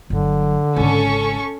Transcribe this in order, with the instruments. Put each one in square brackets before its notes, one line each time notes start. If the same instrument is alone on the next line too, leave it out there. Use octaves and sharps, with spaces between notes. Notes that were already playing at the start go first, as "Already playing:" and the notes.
[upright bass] G1 F#3 [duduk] D3
[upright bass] G#1 C#3 [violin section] C#4 A4 C#6